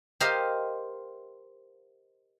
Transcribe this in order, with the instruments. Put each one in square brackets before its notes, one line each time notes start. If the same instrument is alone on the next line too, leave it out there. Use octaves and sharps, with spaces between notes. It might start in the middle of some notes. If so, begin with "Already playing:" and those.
[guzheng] G4 A#4 C5 D#5 F5